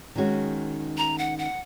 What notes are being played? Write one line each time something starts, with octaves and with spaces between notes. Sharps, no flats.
D#3 G#3 C#4 F#4
A#5
F#5
F#5